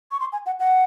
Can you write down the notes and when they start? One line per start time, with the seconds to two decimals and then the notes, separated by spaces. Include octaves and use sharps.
0.12 C#6
0.20 C6
0.32 G#5
0.46 F#5
0.60 F#5